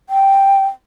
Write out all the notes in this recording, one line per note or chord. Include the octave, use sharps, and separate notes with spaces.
G5